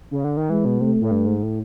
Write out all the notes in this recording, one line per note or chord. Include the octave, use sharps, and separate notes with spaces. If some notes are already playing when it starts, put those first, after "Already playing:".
C#3
D3
D#3
E3 G#3
B2
C3 A3
A2
G2
G#2
A2